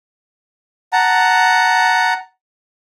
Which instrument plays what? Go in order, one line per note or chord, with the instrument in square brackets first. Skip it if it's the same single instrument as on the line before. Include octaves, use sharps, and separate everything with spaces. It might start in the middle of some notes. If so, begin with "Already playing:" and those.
[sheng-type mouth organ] F#5 A5 A#5